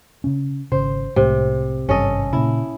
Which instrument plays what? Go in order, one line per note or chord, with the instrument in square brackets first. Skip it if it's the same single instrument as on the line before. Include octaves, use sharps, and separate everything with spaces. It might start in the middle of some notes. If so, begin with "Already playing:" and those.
[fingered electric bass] C#3 C#4
[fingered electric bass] G#1 C#3 [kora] C5
[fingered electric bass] C2 A2 G#3 [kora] C3
[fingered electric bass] G#1 G2 C3 [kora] C#4 A4 D#5
[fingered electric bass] A#2 C#3 [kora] E4